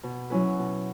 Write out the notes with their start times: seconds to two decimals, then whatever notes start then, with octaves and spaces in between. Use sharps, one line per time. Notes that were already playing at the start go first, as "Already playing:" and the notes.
0.03 B2
0.30 F#3 C#4 E4 B4
0.59 B2